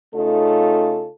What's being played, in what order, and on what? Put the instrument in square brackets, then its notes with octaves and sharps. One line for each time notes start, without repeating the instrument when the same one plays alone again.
[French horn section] C#3 A3 C#4 D#4 F4 A4